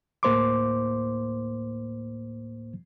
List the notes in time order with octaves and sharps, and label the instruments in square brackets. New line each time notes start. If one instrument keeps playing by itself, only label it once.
[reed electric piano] D2 A2 A#3 C5 C6 D6